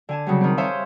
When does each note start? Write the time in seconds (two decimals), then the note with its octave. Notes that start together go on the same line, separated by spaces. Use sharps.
0.09 D3 G#5 A5
0.26 C#3 F#3 G3
0.41 D#3 C4
0.58 C5 C#5 E5 F5 G#5 C6